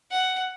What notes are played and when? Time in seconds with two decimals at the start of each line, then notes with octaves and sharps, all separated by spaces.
0.11 F#5